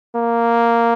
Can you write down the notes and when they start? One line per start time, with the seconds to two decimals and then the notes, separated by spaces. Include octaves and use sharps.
0.16 A#3